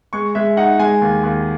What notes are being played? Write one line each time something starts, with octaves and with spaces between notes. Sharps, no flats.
G#3 C#6
G#3 E5
D#4 F#5
G#3 G#5
D#2
D#2